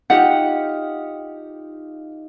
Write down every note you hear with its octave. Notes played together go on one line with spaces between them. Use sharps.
D#4 F4 G4 F#5